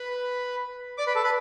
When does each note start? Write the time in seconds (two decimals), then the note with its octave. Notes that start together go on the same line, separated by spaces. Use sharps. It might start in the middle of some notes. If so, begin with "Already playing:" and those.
Already playing: B4 B5
0.98 D5 D6
1.07 B4 B5
1.15 A4 A5
1.24 B4 B5